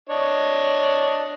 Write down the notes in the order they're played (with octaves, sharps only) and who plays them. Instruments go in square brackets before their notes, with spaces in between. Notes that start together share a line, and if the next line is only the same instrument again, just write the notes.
[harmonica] D4 C#5 D#5